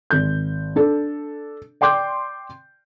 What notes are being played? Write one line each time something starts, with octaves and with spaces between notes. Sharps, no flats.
G#1 G6
D4 A4
D5 G5 C6 D6 G6